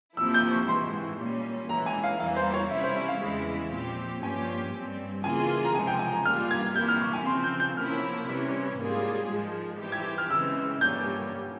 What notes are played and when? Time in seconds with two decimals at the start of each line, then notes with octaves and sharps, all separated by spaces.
0.17 F2 C3 F3 A#3 E4 E6
0.34 G6
0.51 C#6
0.68 G#2 E3 G#3 C6
1.19 A#2 G3 A#3 C#4
1.69 E3 G#3 C#4 A#5
1.86 G#5
2.04 F5
2.20 E2 E3 G3 A#3 F5
2.36 C5
2.54 C#5
2.71 C3 G3 C#4 E4 E5
2.83 C5
2.96 E5
3.08 F5
3.22 E2 C#3 E3 G#3 E4
3.72 A#2 F3 C4 G4
4.22 G2 F3 A#3 C#4 G4 G#5
4.73 G2 G3 C4
5.24 C#3 E3 A#3 F4 G#4 G#5
5.65 A#5
5.74 C#2 C3 F3 G#3 G#5
5.87 G5
5.99 G#5
6.12 A#5
6.25 G2 G3 A#3 F4 F6
6.51 G#6
6.76 C3 G3 A#3 E4 G6
6.88 F6
7.01 C#6
7.13 G#5
7.26 C#3 F3 C4 C6
7.44 G6
7.60 G6
7.77 C3 F3 A#3 C#4 E4 F6
8.28 C3 E3 G3 C#4
8.78 G#2 G3 A#3 F4 G#4
9.29 G#2 F3 G#3
9.79 E3 G3 C4 G4
9.92 G#6
10.18 F6
10.30 C#3 E3 G#3 C4 E6
10.81 G2 G3 A#3 C#4 G6